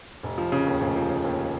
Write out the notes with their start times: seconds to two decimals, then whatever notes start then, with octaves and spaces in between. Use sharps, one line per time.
0.23 F1
0.38 F3
0.52 C#3
0.67 D#2
0.81 F1
0.96 F3
1.10 C#3
1.24 D#2